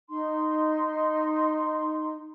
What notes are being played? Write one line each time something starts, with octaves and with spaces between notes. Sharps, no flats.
D#4 C6